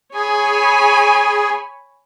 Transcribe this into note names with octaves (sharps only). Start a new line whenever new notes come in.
G#4 C#5 G#5 B5